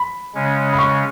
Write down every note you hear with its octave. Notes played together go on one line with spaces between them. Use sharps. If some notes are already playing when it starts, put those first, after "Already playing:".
Already playing: B5
C#3 G#3 C#4
B5
C#6